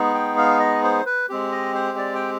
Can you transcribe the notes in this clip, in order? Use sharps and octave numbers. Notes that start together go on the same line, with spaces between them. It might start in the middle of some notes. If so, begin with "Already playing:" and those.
Already playing: G#3 B3 D#4 G#4
G5
F5
D#5
C5
B4
G#3 C4 G4
D#5
C5
D5
G5